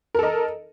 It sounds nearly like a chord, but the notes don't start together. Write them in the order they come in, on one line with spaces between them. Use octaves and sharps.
A#4 A4 D#5